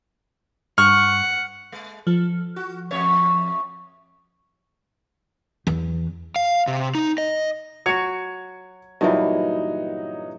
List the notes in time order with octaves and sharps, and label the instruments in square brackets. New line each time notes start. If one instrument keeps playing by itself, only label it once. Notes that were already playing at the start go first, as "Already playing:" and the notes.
[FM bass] G2 [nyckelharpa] F#5 [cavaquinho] C#6 [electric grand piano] F6
[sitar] G#3
[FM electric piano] F3 [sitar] A4
[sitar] F#4
F2 A3 C#5
[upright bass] E2
[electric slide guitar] F5
C3
D#4
D#5
[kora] F#3 F#4 [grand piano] G#6 C#7 F7
[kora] G2 A#2 E3 [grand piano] F#3 D#4